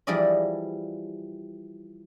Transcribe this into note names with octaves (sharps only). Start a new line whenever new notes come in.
E3 F3 G3 G#4 D5 D#5